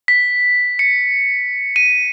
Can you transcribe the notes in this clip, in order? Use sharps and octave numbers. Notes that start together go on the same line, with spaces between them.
B6
C#7
D#7